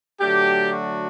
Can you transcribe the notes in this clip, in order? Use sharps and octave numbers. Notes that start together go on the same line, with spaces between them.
D3 F#3 A3 D4 G4
F#4